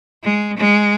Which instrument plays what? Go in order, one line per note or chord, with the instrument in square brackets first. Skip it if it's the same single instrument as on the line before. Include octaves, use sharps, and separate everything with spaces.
[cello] G#3
G#3